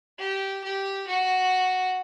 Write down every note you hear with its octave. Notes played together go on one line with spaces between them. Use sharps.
G4
G4
F#4